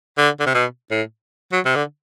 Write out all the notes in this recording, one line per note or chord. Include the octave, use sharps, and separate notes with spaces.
D3
D3
C3
B2
A2
F#3
C3
D3